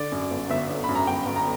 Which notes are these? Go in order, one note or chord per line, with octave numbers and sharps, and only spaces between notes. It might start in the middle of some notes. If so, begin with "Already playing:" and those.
Already playing: D3 D5
F#2
G1
G1 E5
D3
F#2 B5
A#5
G1 G5
G1
A#5